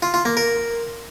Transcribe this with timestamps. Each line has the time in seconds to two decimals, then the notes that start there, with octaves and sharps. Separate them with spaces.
0.02 F4
0.14 F4
0.25 A#3
0.37 A#4